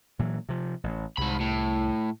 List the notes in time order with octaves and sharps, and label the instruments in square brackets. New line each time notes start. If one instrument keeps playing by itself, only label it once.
[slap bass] A#2 E3 F#3
C3 F3
A1
[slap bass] C2 [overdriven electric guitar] G#2 B5
[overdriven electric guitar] A2